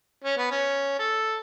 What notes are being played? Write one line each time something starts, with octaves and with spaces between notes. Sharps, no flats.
C#4
B3
C#4
A4